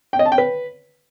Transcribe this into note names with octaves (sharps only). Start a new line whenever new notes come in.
G5
D#5
A5
G5
B4